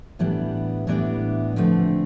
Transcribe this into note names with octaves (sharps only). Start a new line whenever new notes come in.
A2 E3 G3 B3 D4
A2 E3 G3 B3 D4
D3 F3 A3 C4